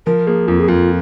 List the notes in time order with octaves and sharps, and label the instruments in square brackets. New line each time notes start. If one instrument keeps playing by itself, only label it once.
[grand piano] F3 [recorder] A#4
[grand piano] A#3 [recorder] G#4
[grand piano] F2 [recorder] F4
[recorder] G#4
[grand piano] F2 [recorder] F4